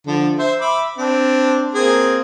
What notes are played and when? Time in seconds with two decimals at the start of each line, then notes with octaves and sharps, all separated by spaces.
0.07 D3 F3
0.39 C5 E5
0.61 E5 B5 D6
0.98 C4 D4
1.75 A#3 C4 G#4